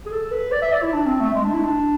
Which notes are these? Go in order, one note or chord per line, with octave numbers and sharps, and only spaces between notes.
G#4
A4
B4
D5
E5
D5
E4
D4
C4
A3
G#3
D4
E4
D4